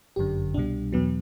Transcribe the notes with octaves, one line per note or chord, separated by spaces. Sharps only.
G1 F#2 D3 G4
C2 B2 G3 D4
E2 B2 F#3 B3